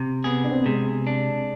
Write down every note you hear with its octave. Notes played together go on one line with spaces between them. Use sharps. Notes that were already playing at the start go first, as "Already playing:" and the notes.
Already playing: C3
B3 G#4
D4
C4
B3
C3 G#3
D4